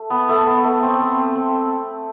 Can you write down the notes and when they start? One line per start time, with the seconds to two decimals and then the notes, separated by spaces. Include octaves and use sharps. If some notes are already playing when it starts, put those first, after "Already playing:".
Already playing: A3
0.10 B3
0.29 A3
0.47 B3
0.64 A3
0.82 C4
1.00 C4
1.35 C4